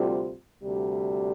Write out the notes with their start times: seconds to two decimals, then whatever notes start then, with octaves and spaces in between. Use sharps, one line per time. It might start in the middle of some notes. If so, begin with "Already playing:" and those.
Already playing: D2 C3 G3 C4 F4
0.62 D2 C3 G3